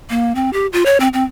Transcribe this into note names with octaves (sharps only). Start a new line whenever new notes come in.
A#3
C4
G4
F4
C#5
C4
C4